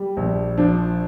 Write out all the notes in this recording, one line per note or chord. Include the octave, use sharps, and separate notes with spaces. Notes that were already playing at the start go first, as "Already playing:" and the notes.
Already playing: G3
A#1
F3 D4